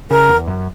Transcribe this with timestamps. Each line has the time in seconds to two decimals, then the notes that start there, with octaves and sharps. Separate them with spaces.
0.11 C#3 A#4
0.29 E2
0.47 F#2